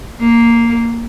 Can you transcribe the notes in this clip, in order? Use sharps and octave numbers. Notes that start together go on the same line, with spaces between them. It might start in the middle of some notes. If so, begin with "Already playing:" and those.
A#3